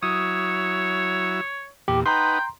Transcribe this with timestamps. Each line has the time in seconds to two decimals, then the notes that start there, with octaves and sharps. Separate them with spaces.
0.03 F#3 E4 C#5 D#6
1.88 E2 A#2 G4
2.06 D#4 B4 F#5 G5 A#5 C6